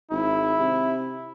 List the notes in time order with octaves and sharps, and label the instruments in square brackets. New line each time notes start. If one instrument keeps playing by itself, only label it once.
[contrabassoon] G#1 [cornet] E4
[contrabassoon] C3